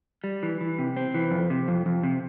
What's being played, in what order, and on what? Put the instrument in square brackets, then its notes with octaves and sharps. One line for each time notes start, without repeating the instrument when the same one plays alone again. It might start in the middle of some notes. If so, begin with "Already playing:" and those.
[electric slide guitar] G3
E3
E3
C3
C4
E3
F2
C3
F2
F2
C3